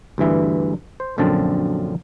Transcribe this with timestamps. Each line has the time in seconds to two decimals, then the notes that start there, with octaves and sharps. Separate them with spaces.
0.18 D2 G2 E3 E5
1.00 C5
1.18 A#1 F#2 D3 C4 A5